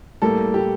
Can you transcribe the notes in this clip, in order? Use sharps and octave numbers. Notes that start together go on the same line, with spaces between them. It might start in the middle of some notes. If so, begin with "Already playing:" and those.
A2 G3 A#3 A4
A2 G3 A#3 G4